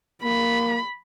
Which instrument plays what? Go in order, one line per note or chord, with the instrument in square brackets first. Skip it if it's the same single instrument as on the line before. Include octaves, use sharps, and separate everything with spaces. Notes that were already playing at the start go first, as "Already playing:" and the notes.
[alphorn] A#3 [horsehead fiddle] B5